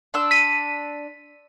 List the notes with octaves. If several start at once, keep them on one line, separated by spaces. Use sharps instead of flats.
D4 C6 E6
B6 D#7